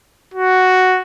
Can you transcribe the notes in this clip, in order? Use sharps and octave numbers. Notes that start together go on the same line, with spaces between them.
F#4